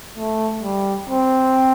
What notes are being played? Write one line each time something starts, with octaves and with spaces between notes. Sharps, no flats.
A3
G3
C4